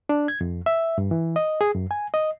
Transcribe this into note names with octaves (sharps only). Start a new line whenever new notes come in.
D4
G#6
F2
E5
G2
E3
D#5
G#4
F#2
G#5
D#5